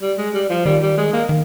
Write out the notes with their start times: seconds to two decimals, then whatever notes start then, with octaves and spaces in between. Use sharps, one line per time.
0.02 G3
0.18 G#3
0.34 G3
0.50 F3
0.66 D#3 G3
0.82 G3
0.98 G#3
1.13 A#3
1.29 D#3